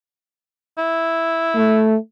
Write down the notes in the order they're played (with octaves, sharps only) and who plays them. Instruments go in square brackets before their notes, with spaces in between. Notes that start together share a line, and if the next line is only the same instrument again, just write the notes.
[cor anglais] E4
[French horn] A3